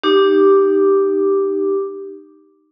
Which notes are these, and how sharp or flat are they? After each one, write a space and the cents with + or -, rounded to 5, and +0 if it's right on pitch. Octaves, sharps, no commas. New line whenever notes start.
D#4 -15 G4 +0 D6 +0